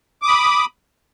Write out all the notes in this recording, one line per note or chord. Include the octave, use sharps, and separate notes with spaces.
B5 D6 D#6